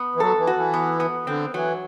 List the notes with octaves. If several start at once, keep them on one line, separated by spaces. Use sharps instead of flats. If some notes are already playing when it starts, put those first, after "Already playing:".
Already playing: B3
E3
F#3 A4
E3
F#4
E3
B3
B3
D3 C4
E3 F#3